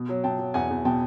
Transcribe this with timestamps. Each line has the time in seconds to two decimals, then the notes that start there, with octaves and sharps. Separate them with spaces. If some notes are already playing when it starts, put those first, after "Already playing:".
Already playing: B2
0.09 F#3
0.24 B2 G5 A5
0.39 F#3
0.54 E2 F#5 G#5
0.70 E2
0.85 B2 G5 A5